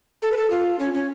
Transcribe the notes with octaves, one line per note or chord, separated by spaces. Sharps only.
A4
B4
A4
F4
C#4
C#4